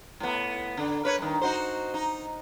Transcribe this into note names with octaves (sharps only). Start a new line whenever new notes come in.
A2 B3
D3 D4
A#4 B4 C#5
G2 D#3
D#4 F#4 C5
D#4